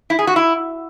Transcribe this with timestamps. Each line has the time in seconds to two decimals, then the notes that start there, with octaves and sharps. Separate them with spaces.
0.10 E4
0.19 G#4
0.27 F#4
0.36 E4